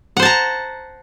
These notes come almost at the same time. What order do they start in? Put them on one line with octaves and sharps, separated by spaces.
F#5 C5 A5 A#5